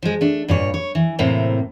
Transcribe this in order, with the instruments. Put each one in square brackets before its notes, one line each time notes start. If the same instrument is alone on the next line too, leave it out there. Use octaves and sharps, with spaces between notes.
[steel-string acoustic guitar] F3 G#3
A3 D4
G2 A#2 C#5
C#5
E3
A2 C3 A#3 C4